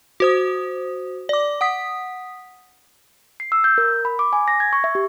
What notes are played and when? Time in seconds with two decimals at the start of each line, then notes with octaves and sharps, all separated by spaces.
0.20 F#4 C5 D#6
1.29 D5 D6
1.61 F#5 D#6 B6
3.40 C7
3.52 E6
3.64 G6
3.78 A#4
4.05 B5
4.19 D6
4.33 G#5
4.48 A#6
4.60 G#6
4.73 C#6
4.84 E5
4.95 G4